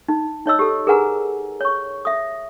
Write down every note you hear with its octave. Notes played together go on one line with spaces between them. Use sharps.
D#4
D#4 C#5 D#5 E6
G4 A4
G#4 A#4 B4 F#5 G#5 A#5
C#5 C#6
E5 D#6